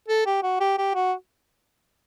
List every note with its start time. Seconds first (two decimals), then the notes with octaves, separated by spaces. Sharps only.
0.08 A4
0.26 G4
0.43 F#4
0.60 G4
0.78 G4
0.95 F#4